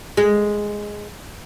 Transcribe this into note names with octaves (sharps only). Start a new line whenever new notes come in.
G#3